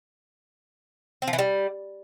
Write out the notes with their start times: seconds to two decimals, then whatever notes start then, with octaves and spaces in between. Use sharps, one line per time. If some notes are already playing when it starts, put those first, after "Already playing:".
1.22 C4
1.28 F3
1.33 E3
1.39 G3